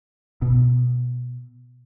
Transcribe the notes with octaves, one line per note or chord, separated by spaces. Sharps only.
B2